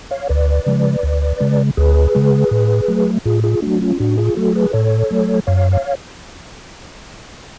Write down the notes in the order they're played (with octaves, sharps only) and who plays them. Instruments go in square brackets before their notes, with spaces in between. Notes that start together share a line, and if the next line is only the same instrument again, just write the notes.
[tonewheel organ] C#5 F5
D2 B4 D5
C#3 F3 G#3
D2
C#3 G#3
D2 G#4 B4
C#3 G#3
A2
F#3 A3
A2 F4 G#4
F4 G#4
F#3 A3 D4 F#4
C#4 F4
A2 D4 F#4
F4 G#4
F#3 A3 F#4 A4
G#4 B4
A2 A4 C#5
F#3 A3
F#2 C#5 F5
C#5 F5